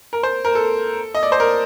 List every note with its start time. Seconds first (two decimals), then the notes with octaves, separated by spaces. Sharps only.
0.13 A#4
0.23 C5
0.45 A#4
0.55 A4
1.15 D#5
1.23 D5
1.32 C5
1.40 A#4